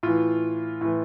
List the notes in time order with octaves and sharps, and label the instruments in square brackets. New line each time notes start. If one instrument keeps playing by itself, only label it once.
[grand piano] A2 E3 F4
A2 E3